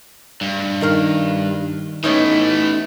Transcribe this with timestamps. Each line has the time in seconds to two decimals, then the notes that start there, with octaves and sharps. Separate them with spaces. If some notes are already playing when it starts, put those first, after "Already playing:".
0.41 G2
0.81 D#3 A#4 F5
2.04 E3 A3 B3 C#4 D#4